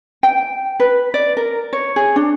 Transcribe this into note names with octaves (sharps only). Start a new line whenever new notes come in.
G5
B4
D5
A#4
C#5
G#4
D4